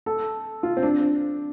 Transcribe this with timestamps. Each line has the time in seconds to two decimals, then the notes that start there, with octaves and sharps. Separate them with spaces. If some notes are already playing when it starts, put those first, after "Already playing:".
0.06 A4
0.63 F4
0.77 C4
0.83 D4